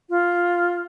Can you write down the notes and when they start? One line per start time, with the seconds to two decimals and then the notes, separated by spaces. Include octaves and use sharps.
0.09 F4